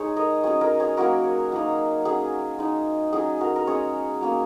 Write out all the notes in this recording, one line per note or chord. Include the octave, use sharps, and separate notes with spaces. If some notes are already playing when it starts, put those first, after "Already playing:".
Already playing: G#3 D#4 G#4 C#5
A#4 D#5
F#3 C#4 G#4 C#5
A#4 D#5
G#4 C#5
F#3 A#3 C#4 F#4 A#4
F#3 A#3 D#4
F#3 C#4 G#4
G#3 D#4
F#3 C#4 G#4
F#4 A#4
A#4
G#3 C#4 G#4 C#5
F#3 A#3 C#4